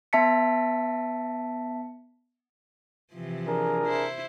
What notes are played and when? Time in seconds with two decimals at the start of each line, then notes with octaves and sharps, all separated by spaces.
0.13 B3 E5 A5 B6 C#7
3.12 C3 E3 F3
3.47 D4 G#4 A#4
3.85 E4 C5